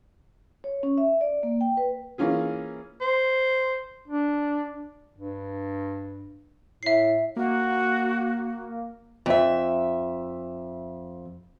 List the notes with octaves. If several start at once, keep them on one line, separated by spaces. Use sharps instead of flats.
C#5
C#4
E5
D5
A#3
G5
B4
E3 A#3 C#4 F4 G#4
C5
D4
G2
A2 E5 C7
A#3 F#4
F2 E5